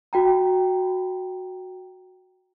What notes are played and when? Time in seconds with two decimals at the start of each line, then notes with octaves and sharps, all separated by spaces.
0.13 F#4 G5 A#5